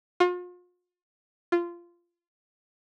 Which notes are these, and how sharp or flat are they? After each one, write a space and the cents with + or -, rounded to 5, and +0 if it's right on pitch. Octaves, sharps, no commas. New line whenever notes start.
F4 +40
F4 -15